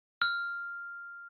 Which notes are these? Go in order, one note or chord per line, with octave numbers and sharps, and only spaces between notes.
F6